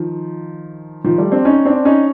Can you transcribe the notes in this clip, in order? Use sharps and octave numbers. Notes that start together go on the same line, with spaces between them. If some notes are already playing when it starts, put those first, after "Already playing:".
Already playing: D#3 F3
D#3 F3
G3 A3
C4 D4
C#4 D#4
C4 D4
C#4 D#4